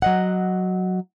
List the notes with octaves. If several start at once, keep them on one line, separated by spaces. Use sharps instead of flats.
F#3 D#5 F#5